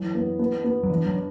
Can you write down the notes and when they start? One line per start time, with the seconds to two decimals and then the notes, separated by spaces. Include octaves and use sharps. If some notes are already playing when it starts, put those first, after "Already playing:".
Already playing: E3 F#3 E4
0.15 B3
0.39 B3
0.64 B3
0.83 F#3
0.89 E3 D4
1.06 F#3
1.14 D4